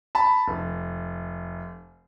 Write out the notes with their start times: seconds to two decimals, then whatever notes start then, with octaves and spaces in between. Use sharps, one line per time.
0.15 A5 B5
0.48 F1